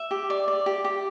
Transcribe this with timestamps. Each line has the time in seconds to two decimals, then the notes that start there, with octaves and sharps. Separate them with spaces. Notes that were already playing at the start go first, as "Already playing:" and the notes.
Already playing: E5
0.11 G4
0.30 D5
0.48 D5
0.66 G4
0.84 G4